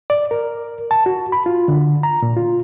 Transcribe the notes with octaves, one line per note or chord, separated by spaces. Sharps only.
D5
A#4
A5
F#4
B5
F4
D3
A#5
A#2
F4